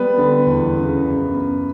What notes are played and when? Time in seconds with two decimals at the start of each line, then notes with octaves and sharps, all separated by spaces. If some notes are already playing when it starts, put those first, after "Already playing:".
Already playing: G3 B3 B4
0.18 D3
0.47 E2
0.76 C#3
1.05 F#2
1.34 B3